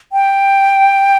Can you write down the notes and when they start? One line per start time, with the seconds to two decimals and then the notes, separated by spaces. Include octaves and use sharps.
0.13 G5